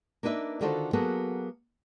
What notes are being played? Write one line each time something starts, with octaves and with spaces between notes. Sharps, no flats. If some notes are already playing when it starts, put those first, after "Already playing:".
A#3 D4 D#4 B4 E5
D3 D#3 F4 F#4 A4 C5
F#3 A#3 B3 F#4 G#4 A4